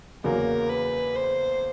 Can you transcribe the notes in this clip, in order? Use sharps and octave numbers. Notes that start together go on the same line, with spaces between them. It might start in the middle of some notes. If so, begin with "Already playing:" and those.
E2 C#3 F#3 A#3 A#4
B4
C5